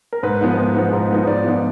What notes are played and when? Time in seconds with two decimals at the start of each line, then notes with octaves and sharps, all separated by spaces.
0.13 A#4
0.23 G#2 B4
0.41 F3 B3 D#4
0.58 G#2
0.75 F3 B3 D#4
0.93 G#2
1.10 F3 B3 D#4
1.27 G#2 D5
1.44 F3 B3 D#4